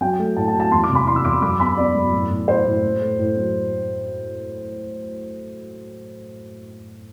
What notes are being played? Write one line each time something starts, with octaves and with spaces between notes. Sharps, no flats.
F#3 G5
A3
A2 A5
A5
F#3
A5
E2 C6
D6
C3
B5
E3 C6
E6
E2 D6
F#2 D6
B3 B5
B3 D5
F#2
A2
A2
A2 C5
A2
A2
A3
A2
F#3